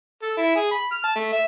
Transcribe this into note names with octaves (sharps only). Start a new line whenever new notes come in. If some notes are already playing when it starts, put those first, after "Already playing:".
A4
E4
G#4
B5
F6
A5
A3
E5